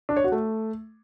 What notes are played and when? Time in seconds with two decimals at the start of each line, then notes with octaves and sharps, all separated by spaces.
0.09 D4
0.17 C#5
0.24 F#4
0.32 A3